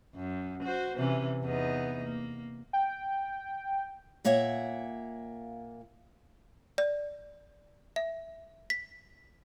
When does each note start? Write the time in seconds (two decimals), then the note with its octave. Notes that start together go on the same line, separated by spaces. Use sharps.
0.15 F#2
0.63 F#4 C5
0.97 C3 E3 C#4
1.43 E2 B3 D#4
2.03 A#3
2.73 G5
4.25 A#2 A#3 C#5 E5 F#5
6.78 D5
7.96 E5
8.70 B6